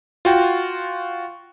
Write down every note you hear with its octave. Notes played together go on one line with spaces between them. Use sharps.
F4 F#4 G5